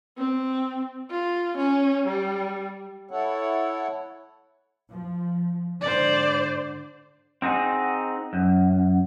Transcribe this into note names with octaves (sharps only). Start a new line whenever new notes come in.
C4
F4
C#4
G3
E4 A4 C#5 F#5
F3
G#2 D3 C5 D5
C4 D#4 F#4 G#4
F#2